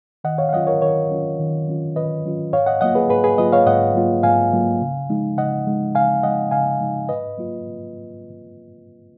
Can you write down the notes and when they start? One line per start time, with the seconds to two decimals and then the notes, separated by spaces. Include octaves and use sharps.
0.24 D#3 D#5 F#5
0.38 C#5 F5
0.49 F5
0.53 F#3 C#4 F4 D#5 F#5
0.67 A#4 C#5
0.81 D#3 A#4 C#5
1.11 F#3 C#4 F4
1.39 D#3
1.67 F#3 C#4 F4
1.96 D#3 B4 D#5
2.25 F#3 C#4 F4
2.53 G#2 C#5 F5
2.66 D#5 F#5
2.81 F#3 A#3 F4 D#5 F#5
2.95 G#4 B4
3.09 G#2 G#4 B4
3.24 G#4 B4
3.38 F#3 A#3 F4 B4 D#5
3.52 C#5 F5
3.66 G#2 D#5 F#5
3.95 F#3 A#3 F4
4.23 G#2 F5 G#5
4.53 F#3 A#3 F4
4.81 C#3
5.09 F3 G#3 D#4
5.37 C#3 D#5 F#5
5.66 F3 G#3 D#4
5.95 C#3 F5 G#5
6.23 F3 G#3 D#4 D#5 F#5
6.51 C#3 F5 G#5
6.80 F3 G#3 D#4
7.09 G#2 B4 D#5
7.38 F#3 A#3 F4